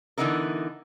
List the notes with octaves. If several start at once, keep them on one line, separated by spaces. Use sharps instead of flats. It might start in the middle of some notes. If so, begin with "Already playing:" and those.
D3 E3 B3 D#4 E4 A#4